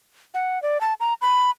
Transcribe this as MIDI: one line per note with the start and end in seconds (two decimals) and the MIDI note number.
0.34 0.61 78
0.62 0.80 74
0.81 0.94 81
1.00 1.14 82
1.21 1.51 83